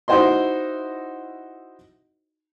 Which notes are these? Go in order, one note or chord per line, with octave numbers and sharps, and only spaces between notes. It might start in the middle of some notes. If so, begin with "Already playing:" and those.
D#4 E4 F#4 C5 D#5 C6